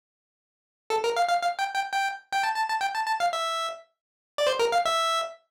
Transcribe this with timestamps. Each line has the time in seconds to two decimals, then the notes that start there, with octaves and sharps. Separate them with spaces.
0.90 A4
1.04 A#4
1.16 F5
1.29 F5
1.42 F5
1.59 G5
1.75 G5
1.92 G5
2.32 G5
2.43 A5
2.56 A5
2.69 A5
2.81 G5
2.95 A5
3.07 A5
3.20 F5
3.33 E5
4.38 D5
4.47 C5
4.59 A#4
4.72 F5
4.85 E5